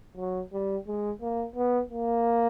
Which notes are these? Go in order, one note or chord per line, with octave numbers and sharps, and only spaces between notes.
F#3
G3
G#3
A#3
B3
A#3